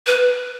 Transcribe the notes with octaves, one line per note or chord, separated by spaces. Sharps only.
B4